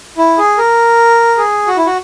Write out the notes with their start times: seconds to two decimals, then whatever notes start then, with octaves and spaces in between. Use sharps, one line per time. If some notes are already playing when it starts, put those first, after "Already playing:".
0.18 E4
0.38 G#4
0.58 A#4
1.37 G#4
1.67 F#4
1.77 E4
1.86 F#4